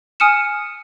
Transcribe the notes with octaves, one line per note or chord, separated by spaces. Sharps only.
G#5 D#6 F6 C#7 E7